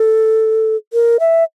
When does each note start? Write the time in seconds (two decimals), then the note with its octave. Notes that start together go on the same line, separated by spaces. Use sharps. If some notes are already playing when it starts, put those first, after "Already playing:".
Already playing: A4
0.93 A#4
1.20 E5